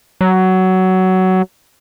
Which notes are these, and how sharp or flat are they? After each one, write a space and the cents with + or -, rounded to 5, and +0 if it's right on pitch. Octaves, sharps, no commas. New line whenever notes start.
F#3 +15